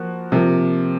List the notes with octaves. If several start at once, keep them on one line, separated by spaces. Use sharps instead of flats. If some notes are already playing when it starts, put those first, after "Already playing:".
Already playing: F3 A#3 F#4
C3 F3 A#3